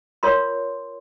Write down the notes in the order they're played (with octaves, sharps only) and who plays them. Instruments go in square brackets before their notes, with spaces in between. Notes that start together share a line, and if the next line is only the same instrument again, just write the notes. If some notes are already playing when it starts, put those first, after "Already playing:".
[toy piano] F4 A#4 C#5 C6